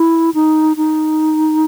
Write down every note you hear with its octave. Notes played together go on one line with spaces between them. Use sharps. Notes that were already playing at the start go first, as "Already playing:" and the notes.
Already playing: E4
D#4
D#4